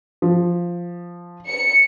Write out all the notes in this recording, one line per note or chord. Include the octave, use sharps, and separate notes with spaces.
F3
C#7